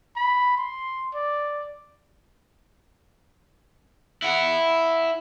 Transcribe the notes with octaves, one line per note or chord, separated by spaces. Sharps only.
B5
C6
D5
E4 F#5